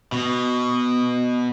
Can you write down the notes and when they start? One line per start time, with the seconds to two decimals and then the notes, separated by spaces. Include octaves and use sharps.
0.12 B2